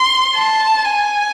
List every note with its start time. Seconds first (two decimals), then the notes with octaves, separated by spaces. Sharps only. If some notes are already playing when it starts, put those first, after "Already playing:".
Already playing: C6
0.36 A5
0.85 G#5